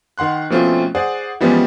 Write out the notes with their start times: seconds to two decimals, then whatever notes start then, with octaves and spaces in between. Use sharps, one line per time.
0.18 D#3 F#5 C6 F#6
0.50 B2 F3 A3 C4 C#4 F4
0.95 G#4 C5 D5 F#5
1.41 E3 F3 G3 G#3 B3 C#4